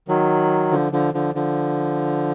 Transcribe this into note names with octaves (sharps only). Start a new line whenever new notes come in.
D#3 F#3
D3 F3
D3 F3
D3 F3
D3 F3